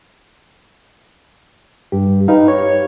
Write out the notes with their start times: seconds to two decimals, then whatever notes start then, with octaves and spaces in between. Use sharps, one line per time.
1.92 G2 G4
2.28 D#4 G4 B4 F5
2.48 C#5